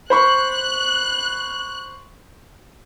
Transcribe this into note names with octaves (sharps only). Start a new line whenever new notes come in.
C5 B5 C#6 F#6